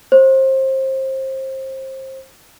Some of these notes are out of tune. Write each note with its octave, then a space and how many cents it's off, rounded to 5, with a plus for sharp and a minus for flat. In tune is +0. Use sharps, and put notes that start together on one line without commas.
C5 +25